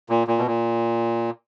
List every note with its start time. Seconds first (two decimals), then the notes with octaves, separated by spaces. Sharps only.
0.09 A#2
0.27 A#2
0.38 B2
0.46 A#2